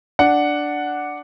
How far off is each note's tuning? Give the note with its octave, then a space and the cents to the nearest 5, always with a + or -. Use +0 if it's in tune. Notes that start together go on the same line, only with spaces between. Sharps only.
D4 +0 F#5 +0